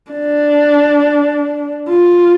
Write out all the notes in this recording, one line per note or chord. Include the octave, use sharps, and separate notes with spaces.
D4
F4